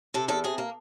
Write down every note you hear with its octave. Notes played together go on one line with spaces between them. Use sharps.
C3 A4
E2 A4
C3 G#4
A#3